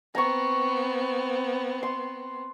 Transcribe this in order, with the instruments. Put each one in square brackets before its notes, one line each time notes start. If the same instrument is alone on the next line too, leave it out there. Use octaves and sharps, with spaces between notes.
[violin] B3 C4 [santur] A#5 C#6
[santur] C6